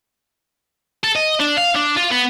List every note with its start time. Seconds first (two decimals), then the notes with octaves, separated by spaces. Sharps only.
1.04 A4
1.16 D#5
1.40 D4
1.57 F5
1.75 D4
1.96 F4
2.11 B3